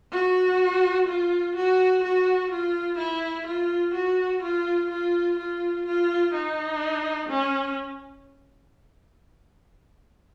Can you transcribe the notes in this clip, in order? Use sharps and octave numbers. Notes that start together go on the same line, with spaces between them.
F#4
F4
F#4
F#4
F4
E4
F4
F#4
F4
F4
F4
F4
D#4
C#4